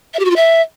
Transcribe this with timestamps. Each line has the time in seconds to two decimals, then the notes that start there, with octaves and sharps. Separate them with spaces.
0.13 E5
0.19 G4
0.24 F#4
0.30 F4
0.36 E5